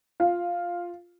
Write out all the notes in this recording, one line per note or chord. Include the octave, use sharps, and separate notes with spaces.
F4